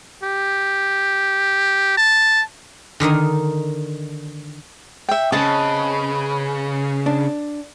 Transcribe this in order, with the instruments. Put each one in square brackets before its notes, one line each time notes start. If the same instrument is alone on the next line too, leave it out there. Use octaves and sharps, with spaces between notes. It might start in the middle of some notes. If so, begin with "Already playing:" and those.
[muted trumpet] G4
A5
[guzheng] D3 D#3 A#4 D#5
[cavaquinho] E5 G5
[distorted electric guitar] C#3 [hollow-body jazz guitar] C4 C#4 [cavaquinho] B4 D#5 A5
[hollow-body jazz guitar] D4